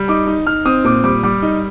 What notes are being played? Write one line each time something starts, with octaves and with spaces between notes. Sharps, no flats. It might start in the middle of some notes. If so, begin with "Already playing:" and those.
Already playing: G3
D#4 D6
D#4
D#4 F6
C4 D#6
A#2 D6
G3 D6
G3 D6
D#4